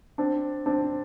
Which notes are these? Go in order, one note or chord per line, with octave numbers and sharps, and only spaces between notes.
C4 D4
C4 D4